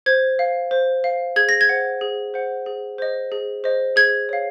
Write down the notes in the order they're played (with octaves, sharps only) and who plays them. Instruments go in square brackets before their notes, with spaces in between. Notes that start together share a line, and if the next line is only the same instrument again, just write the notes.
[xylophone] C5 G#6
F5
C5
F5
G#4 G#6
A#6
G#6
C5 F#5
G#4
C5 F#5
G#4
C5 D#5
G#4
C5 D#5
G#4 G#6
C#5 F5